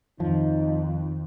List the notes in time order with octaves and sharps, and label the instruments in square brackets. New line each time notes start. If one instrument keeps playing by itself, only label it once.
[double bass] F2 [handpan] D#3 [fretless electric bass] F3 [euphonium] D#4